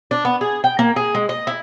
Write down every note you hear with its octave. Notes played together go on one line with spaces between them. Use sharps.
D4
B3
G#4
G5
A#3
G#4
G#3
D#5
E4